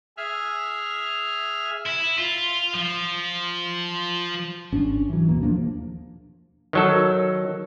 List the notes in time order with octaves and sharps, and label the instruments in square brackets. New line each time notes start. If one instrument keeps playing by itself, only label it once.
[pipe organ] G#4 E5 F6
[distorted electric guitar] E4
F4
F3
[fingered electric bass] G#1 C#4 D4
E3 F#3
D#2 B2 A#3
E2 F3 A#3 D4
[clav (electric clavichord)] D#3 F#3 A4